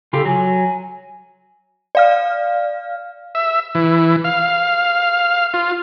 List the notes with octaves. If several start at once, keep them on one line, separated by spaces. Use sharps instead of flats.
C#3 F4 G4 A4
F#3 G#5
D5 F5 F6
E5
E3
F5
F4